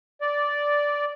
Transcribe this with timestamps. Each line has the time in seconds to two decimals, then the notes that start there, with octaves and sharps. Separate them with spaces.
0.21 D5